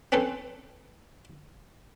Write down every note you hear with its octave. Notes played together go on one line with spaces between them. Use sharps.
C4 C#4 A4 B4 C5